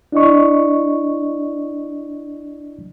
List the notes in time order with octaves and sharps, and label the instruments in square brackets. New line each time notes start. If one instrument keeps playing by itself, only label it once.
[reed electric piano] D4 E4 D5 D#5 C#6